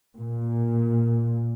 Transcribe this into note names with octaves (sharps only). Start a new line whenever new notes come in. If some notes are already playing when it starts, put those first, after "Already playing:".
A#2